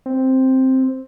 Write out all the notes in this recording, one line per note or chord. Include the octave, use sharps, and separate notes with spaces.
C4